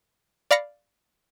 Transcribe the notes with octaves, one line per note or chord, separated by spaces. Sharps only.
D5 F5 B5 A#6 C#7